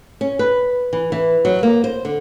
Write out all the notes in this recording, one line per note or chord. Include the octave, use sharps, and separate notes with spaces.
C#4
B4
E3
E3
F#3
A#3
C5
D3